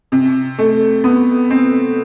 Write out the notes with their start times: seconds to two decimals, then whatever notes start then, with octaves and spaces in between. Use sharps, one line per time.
0.12 C3
0.59 A3
1.04 B3
1.50 C4